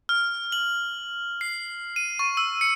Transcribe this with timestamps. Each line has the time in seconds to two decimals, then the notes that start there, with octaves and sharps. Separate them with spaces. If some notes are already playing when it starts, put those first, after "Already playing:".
0.09 F6
0.52 F#7
1.41 C7
1.96 D#7
2.19 C#6
2.37 E6
2.61 C#7